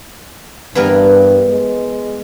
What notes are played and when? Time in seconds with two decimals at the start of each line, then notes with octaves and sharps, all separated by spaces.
0.75 G2 E3 B3 A#4
1.50 G#3